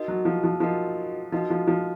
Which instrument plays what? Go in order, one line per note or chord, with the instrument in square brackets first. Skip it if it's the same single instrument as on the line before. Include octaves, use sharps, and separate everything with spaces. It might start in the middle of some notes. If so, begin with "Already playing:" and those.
Already playing: [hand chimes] D#4 F#4 A#4 D#5
[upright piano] F#3
F3
F3
[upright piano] F3 [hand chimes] D#4 F#4 A#4 D#5
[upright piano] F3 [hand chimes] D#4 F#4 A#4 D#5
[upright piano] F3
F3